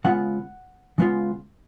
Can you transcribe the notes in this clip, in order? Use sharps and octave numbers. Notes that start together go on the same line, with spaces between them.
C#3 G#3 B3 F4 F#5
C#3 G#3 B3 F4